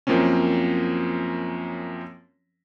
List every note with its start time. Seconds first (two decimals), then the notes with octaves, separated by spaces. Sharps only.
0.07 F#2 F3 A#3 C4 C#4